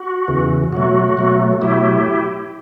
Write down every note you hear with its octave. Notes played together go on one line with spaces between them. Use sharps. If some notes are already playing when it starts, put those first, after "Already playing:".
Already playing: F#4
E2 C#3 E3
B2 F#3 A3 F#4
B2 F#3 A3
B2 F#3 A3 E4 G4